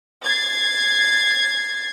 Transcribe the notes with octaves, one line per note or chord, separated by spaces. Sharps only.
G#6 A6 C7